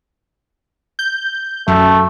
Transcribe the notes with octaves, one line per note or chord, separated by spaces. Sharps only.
G6
F#2 A3